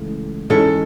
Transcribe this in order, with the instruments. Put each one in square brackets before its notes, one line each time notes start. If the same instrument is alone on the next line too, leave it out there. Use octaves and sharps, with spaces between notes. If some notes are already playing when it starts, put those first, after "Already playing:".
Already playing: [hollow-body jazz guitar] C#2 C#3 E3 A3
[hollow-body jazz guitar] G#2 E3 G#3 C#4 E4 [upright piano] A4